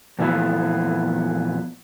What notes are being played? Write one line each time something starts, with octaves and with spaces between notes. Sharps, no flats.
F2 A#2 E3 A3 B3 F4